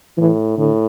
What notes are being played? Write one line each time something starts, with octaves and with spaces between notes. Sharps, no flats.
A2 E3
A2 D3